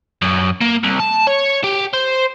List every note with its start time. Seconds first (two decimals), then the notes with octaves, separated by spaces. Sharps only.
0.22 F#2
0.61 A#3
0.84 C2
1.00 A5
1.27 C#5
1.64 G4
1.93 C5